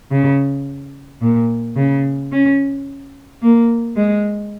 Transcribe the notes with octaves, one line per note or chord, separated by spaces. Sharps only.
C#3
A#2
C#3
C#4
A#3
G#3